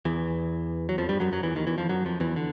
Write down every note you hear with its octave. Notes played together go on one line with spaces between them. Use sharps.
E2 E3
F#3
F2 F3
G2 G3
F#2 F#3
F#2 F#3
E2 E3
D#2 D#3
E2 E3
F2 F3
F#2 F#3
F2 F3
E2 E3
D3